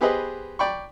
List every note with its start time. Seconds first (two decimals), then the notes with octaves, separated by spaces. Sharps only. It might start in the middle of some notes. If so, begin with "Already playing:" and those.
0.01 B3 G4 G#4 B4 C5 D#5
0.59 D5 G5 B5 C#6